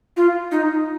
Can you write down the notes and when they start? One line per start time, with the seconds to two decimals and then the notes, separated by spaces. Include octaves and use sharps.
0.17 F4
0.51 D#4